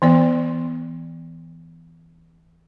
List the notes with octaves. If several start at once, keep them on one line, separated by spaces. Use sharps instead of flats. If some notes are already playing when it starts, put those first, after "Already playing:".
E3 B3 D5